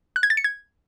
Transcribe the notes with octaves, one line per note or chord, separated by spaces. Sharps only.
F#6
G#6
A6
C#7
G#6